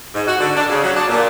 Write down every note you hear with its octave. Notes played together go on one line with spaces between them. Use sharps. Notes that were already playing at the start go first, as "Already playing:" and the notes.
G#2
F#4
D3
D4
C#3
F#3
D4
A#2